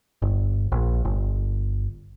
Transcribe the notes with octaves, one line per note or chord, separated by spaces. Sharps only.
G1
A#1
G1